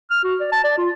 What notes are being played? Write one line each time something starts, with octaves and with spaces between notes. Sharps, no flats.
F6
F#4
D5
A5
D5
F4